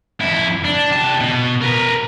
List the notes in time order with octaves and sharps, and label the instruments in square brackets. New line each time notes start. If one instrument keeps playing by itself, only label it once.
[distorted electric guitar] F2 E4
D4
C3 A5
B2
A#4 B4